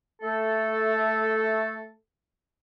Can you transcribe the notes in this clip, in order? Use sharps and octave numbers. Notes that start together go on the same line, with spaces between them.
A3 A4